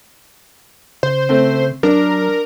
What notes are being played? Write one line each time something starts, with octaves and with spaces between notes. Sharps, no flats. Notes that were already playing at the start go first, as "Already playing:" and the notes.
C#3 C5
A3 C4
F#3 D4 A#4